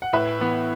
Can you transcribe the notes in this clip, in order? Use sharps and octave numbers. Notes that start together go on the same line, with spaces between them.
F#5
A2 B4 E5
E3 B3